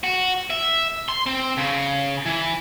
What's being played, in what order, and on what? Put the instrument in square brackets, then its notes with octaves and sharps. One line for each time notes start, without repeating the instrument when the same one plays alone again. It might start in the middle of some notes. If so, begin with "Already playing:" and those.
[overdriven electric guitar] F#4
E5
C6
C4
C#3
E3